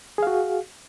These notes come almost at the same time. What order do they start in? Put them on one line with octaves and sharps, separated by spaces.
G#4 F5 F#4